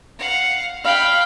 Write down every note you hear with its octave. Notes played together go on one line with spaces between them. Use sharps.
F5 F#5
F5 G5 B5